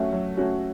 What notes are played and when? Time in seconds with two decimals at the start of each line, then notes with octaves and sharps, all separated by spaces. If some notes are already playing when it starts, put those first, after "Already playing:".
Already playing: F#3 A3 C#4 F#4
0.12 F#3
0.37 A3 C#4 F#4